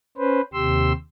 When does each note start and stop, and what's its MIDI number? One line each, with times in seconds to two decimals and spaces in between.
0.18 0.41 61
0.18 0.41 71
0.18 0.41 72
0.54 0.93 39
0.54 0.93 48
0.54 0.93 67
0.54 0.93 84
0.54 0.93 88